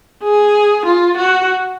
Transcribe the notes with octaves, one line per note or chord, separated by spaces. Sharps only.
G#4
F4
F#4